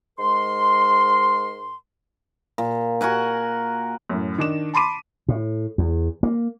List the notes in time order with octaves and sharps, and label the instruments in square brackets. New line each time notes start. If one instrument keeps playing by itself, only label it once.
[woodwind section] G#2 G#3 A#4 C6
[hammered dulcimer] A#2
F#4 A#4 F#5 G#5
[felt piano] F#2 A2
D#3 D4 E7
A5 B5 C6 D6 D#7
[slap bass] A2
E2
A#3